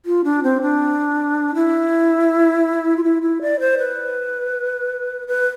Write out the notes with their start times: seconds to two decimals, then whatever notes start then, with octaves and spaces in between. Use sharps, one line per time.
0.06 F4
0.24 D4
0.43 C4
0.62 D4
1.55 E4
2.97 F4
3.04 E4
3.22 E4
3.42 D5
3.60 C5
3.78 B4
5.28 B4